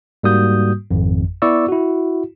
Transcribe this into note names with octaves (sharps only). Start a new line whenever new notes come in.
G#2 G3 A#3 F#4 D#6 G6
G#1 F2
B3 E4 D5 C#6 E6
E4 F#4